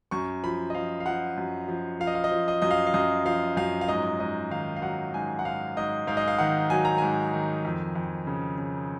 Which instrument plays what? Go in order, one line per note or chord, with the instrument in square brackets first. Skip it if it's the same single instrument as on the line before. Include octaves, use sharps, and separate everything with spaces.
[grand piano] F#2 C#6
F3 B5
D#5
F3 F5
F5
F3 F#5
F#2
F3
F3 F5
D#5
F5
D#5
F3
D#5
F#2 D#5
F5
F5
F#2 D#5
F3 F5
F#2 F5
F5
G#2 D#5
G#2 D#5
D#3 F5
F5
F#3 F#5
G#2 G#5
F#5
G#2 F5
G#2 D#5
G#2 F5
D#5
F5
D#3 F#5
F#3 G#5
A#5
G#2 G#5
D#3
F2
F2
C#3
C#3